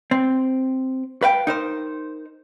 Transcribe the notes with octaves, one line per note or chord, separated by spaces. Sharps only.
C4
B4 F5 G5
D#4 A#4 C5